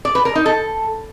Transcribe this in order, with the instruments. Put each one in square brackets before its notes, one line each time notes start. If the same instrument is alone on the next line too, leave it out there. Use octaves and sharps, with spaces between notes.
[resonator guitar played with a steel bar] D5
B4
A#4
D#4
A4